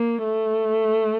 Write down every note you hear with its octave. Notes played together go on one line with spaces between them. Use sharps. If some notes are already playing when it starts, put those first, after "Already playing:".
Already playing: A#3
A3